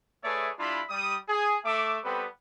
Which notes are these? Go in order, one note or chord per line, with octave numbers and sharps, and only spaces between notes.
A3 G#4 B4 C#5 D5 E5
G3 D4 E4 F4 B5 C6
G3 D#6
G#4
A3 E5 D6
G3 B3 C4 A4 B4